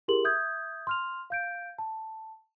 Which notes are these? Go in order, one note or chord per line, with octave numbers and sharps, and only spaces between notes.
E4 G4 G#4 A#4 C6 F#7
E5 D#6 G6 G#6
C6 F6 F7
F5 G6 D7
A5